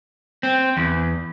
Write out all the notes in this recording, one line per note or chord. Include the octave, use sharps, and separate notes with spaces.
C4
E2